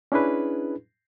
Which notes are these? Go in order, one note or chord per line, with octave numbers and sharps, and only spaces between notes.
C#4 D4 E4 G#4 B4